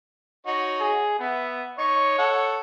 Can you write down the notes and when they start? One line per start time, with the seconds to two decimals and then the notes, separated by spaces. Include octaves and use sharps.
0.47 D#4 F#4 C#5
0.80 G#4
1.19 B3 E5
1.79 D#4 C#5 C#6
2.18 A4 F#5